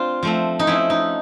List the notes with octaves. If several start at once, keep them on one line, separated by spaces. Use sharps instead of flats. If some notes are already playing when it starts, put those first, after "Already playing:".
Already playing: C4 D4 F4
F3 A3 C4
D#4
F3 A3 C#4 E4
D#4